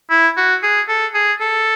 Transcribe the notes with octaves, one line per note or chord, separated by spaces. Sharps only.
E4
F#4
G#4
A4
G#4
A4